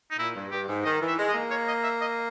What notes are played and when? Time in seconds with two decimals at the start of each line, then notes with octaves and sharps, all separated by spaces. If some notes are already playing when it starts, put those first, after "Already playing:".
0.11 D#4
0.18 A#2 E4
0.36 G2
0.51 G2 G4
0.68 G#2
0.84 D#3 D#5
1.02 E3
1.08 E5
1.18 G#3
1.29 D#5
1.34 A#3
1.51 C#5
1.68 D#5
1.84 E5
2.01 D#5